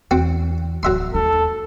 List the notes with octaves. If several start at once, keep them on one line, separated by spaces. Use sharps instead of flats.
E2 C4 F#4
D1 E2 F#3 E5 C6
D#2 D#4 A4